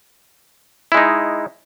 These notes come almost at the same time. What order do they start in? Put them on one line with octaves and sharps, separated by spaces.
E4 G#3 D#4